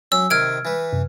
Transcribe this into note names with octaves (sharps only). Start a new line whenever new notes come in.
F#3 C#4 E6
C3 D#3 F6 G#6 D7
E3 B4
F#2 C3